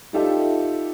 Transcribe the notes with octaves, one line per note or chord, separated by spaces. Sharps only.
D#4 F4 G4 A4 D5 E5